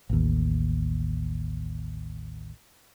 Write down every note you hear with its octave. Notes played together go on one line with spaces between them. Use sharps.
A1 D#2